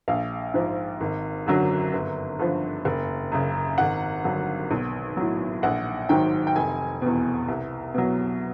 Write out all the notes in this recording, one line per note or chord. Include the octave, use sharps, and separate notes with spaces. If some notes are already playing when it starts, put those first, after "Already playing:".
A#1 F5
G#2 F3
G#1
F#2 D3 F#3
G1
G2 D3 F3
F#1
F#2 C#3
G#1 F#5
G2 D3 F#3
B1
A2 F#3
A#1 F#5
G#2 D#3 F#3 G5
G5
F1 G#5
E2 B2
C2
B2 F#3